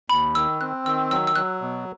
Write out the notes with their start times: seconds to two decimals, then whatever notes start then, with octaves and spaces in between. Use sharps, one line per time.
0.10 D#2 B5
0.35 D#3 E6
0.61 C4 F#6
0.86 D#3 E6
1.11 F#3 E6
1.27 E6
1.36 F#3 F#6
1.61 B2